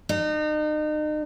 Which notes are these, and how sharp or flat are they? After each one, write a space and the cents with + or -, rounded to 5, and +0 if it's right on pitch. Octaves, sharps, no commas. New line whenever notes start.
D#4 -35